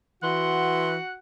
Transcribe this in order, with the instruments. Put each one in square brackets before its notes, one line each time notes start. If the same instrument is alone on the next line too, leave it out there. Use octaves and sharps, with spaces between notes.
[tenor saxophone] E3 [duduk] F#4 [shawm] F#5 [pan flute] C6